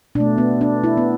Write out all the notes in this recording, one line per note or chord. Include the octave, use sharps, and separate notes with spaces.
B2 A3 D4
B3
D4
E4
B3